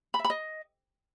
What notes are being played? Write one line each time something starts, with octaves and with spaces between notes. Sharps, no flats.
B5
E5
B5
D#5